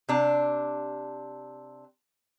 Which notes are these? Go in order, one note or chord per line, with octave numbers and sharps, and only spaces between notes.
C3 D4